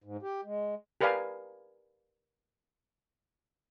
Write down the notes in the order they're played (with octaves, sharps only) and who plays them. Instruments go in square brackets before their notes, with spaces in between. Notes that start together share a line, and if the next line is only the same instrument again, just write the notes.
[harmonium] G#2
G4
G#3
[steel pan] G4 A#4 B4 D5 F5 G#5